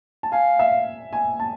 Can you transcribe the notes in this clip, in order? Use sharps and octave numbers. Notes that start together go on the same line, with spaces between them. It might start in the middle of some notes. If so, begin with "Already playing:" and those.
A5
F5 G#5
E5
G#5
A5